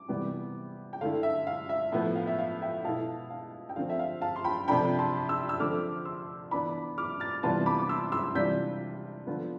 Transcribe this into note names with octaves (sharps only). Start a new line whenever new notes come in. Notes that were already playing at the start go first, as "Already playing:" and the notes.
Already playing: D6
C3 E3 G3 B3
G5
D3 A3 E4 F5
E5
F5
E5
A2 F3 B3 E5
F5
E5
F5
E5 G5
B2 A3 E4 F5 A5
F5
G5
D3 F3 A3 C4 F5
E5
F5
F5 A5
C6
G5 B5
C3 F3 A3 D4 G5 B5
A5 C6
C6 E6
E6
D3 F3 A3 C4 D6 F6
C6 E6
E3 B3 D4 B5 D6
D6 F6
F6 A6
C3 E3 G3 B3 F4 A5 C6
B5 D6
D6
C6 E6
C6 E6
C3 E3 G3 D4 F4 G6 B6
D3 F3 B3 F4